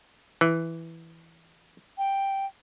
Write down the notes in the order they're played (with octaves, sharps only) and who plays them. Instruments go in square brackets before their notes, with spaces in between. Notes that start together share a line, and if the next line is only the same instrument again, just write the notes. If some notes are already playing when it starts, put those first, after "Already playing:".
[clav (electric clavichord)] E3
[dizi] G5